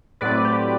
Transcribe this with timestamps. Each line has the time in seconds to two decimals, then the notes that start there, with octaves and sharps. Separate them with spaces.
0.21 A2 F#3 C4 B4 D5
0.45 G4